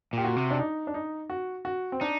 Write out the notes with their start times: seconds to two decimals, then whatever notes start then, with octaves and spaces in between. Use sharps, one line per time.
0.13 A#2 G4
0.24 F#4
0.36 C3
0.51 D4
0.59 D#4
0.87 D4
0.94 D#4
1.30 F#4
1.65 F#4
1.92 C4
2.01 D4 D#4